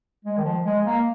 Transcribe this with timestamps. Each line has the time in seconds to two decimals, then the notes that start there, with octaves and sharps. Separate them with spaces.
0.25 G#3
0.37 D#3
0.45 F3
0.65 G#3
0.85 A#3